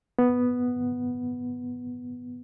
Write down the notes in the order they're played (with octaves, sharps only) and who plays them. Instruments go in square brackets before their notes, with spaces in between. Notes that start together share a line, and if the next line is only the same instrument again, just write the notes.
[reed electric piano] B3